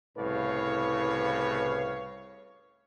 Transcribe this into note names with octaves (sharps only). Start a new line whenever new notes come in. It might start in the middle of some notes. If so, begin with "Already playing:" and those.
C2 A2 C#3 B4 C#5 F5